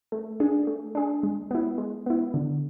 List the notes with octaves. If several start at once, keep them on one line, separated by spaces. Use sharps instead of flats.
A3
D4 G#4
A3
D4 G#4
G#3
B3 E4
G#3
B3 E4
D3